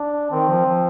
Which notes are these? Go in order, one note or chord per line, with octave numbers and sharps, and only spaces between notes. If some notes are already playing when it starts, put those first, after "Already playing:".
Already playing: D4
D#3 C4
F3
F3